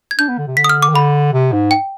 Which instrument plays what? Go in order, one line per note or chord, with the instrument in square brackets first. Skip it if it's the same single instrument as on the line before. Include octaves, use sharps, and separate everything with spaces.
[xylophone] G#6
[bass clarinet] D4 [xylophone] G6
[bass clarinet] B3
D3
C3
[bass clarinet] D3 [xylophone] B6
[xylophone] D#6
F6
D6
[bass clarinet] D#3
[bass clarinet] D3 [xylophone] B5
[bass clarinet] C3
G#2
[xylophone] G5